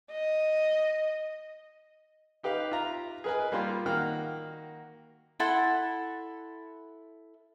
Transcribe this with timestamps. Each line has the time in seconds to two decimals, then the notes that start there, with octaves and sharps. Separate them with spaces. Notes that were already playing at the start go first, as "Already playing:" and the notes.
0.11 D#5
2.43 D#4 G4 B4 F5
2.71 F4 E5 A#5
3.24 G#4 A#4 B4 D#5 G#5
3.52 G3 A#3 F4 C6
3.86 D#3 A#3 F#4 F#5 G5 F6
5.40 E4 A4 F#5 C6